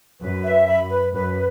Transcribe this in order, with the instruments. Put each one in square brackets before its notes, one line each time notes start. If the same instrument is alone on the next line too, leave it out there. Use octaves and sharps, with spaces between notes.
[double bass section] F#2 [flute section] B4
[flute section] E5
B5
B4
[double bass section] F#2 [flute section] B4